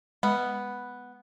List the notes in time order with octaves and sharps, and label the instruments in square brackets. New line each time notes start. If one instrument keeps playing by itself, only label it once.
[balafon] G#3 [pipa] B3